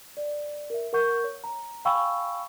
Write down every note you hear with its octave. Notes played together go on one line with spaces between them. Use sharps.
D5
A#4 E5
A#4 F#5 C#6 G6
C#5
A#5
F5 G5 G#5 B5 C#6 E6